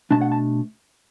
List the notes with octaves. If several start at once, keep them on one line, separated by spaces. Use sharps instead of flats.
B2 A3 D4 A5
F#5
A5